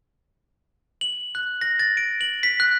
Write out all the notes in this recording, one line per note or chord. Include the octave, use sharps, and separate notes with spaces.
F#7
F#6
A#6
A6
D7
F#7
B6
F#6